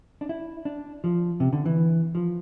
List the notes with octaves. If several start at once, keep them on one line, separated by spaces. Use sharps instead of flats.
D4
E4
D4
F3
C3
D3
E3
F3